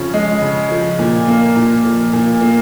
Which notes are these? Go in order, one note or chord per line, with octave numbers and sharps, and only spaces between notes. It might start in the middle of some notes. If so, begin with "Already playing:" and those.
Already playing: C#3 F3 C#4
G#3
C#3
F3
A#2
A#3
A#2
F3
A#2
A#3